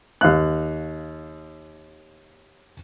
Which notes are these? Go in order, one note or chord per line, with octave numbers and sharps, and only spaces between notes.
D#2 F5 F#6